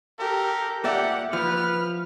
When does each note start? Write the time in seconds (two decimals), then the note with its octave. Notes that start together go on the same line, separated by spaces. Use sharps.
0.19 G4 A4 A#4
0.84 A#2 G4 D5 E5 F#5
1.33 F3 B4 F6